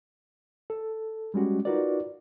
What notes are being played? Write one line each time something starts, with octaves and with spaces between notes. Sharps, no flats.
A4
G3 G#3 C#4 F#4 G4
D#4 F4 F#4 A#4 B4 D5